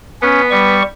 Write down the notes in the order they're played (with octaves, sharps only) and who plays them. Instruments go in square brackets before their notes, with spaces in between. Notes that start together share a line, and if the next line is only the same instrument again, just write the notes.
[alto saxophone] B3 [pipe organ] C#4
[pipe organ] G3 C#6